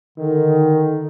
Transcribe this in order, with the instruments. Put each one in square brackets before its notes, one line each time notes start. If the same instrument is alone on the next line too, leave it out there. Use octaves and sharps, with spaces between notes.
[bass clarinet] D3 [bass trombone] D#3